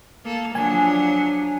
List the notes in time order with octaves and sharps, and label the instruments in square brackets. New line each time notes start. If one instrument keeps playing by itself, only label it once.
[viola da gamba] A#3 A4
[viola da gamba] F3 F#3 D4 [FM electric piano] G#5